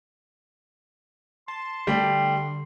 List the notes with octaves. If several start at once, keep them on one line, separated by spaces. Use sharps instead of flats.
A5 C6
D3 G3 A3 G5